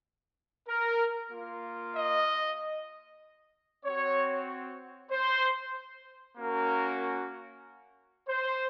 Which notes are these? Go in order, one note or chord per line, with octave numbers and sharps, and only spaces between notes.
A#4
A#3 F4
D#5
C4 F#4 C#5
C5
A#3 C#4 F#4 A#4
C5